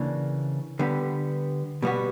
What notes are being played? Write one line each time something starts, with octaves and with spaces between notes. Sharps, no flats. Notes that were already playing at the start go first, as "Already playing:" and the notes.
Already playing: C#3 E3 A#3 D4
D3 G3 B3
B2 G3 B3 F#4